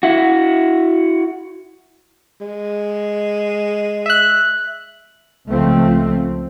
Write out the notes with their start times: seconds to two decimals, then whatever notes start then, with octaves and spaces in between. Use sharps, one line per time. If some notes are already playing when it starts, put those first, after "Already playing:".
0.03 E4 F#4
2.41 G#3
4.06 E5 F#6
5.49 C#2 F3 A3 C4